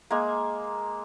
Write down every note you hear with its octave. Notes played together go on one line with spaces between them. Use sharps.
G#3 A#3